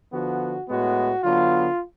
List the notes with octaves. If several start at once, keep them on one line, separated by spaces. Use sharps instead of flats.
D3 F3 B3 F#4
A2 G#3 B3 F#4
D3 F#3 B3 F4